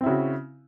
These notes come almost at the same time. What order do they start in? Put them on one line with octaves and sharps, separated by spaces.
C4 E4 C#3 F#4